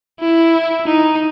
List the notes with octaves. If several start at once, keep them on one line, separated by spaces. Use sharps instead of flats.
E4
D#4